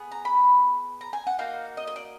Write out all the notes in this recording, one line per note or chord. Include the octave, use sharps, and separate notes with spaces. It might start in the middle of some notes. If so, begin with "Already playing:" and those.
Already playing: B3 G#4
A#5
B5
A#5
G#5
F#5
A#3 D#4 F#4 F5
D#5
D#5
D5